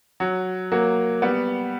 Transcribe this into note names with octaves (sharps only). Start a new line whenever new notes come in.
F#3
F#3 A#3
G3 B3